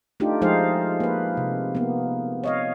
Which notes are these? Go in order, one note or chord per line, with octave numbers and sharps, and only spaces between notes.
A3 D4 D#4 F4 G4
F3 G#3 D#4 G#4 C5 F5
A#3 B4
C3
A#3 B3
C#5 D#5 F5